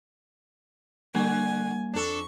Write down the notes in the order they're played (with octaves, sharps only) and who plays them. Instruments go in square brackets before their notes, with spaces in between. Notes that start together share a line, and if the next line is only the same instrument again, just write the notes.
[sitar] D3 [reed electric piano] G3 A#3 [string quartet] G#5
[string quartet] F2 C#6 [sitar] D4 A4